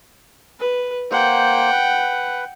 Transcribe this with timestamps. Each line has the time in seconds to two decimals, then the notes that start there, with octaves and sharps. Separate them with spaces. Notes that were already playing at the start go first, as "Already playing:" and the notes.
0.59 B4
1.11 A#3 C5 F#5 G5
1.72 B4